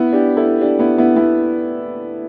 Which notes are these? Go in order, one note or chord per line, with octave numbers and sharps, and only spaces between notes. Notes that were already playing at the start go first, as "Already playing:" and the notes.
Already playing: B3 E4
D4 G4
E4 A4
D4 G4
B3 E4
B3 E4
B3 E4